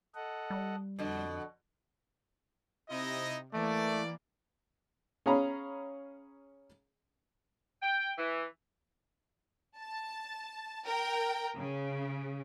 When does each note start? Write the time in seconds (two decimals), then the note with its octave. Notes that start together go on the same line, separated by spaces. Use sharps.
0.15 A4 D#5 F#5
0.50 G3
0.99 F2 B2 D3
2.90 C3 D#4 E4 D#5
3.53 E3 A3 A#3 D5
5.26 C#4 G#4 C#5 F5 A#5 B5
7.82 G5
8.17 E3
9.78 A5
10.85 A#4 G5
11.56 C#3